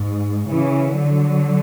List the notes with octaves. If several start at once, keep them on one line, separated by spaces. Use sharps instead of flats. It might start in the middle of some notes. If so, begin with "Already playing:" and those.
Already playing: G#2
C#3 E3
D3 F#3